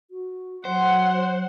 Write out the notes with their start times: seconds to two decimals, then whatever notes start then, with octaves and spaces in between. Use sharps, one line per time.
0.11 F#4
0.65 F#3 C5 F#5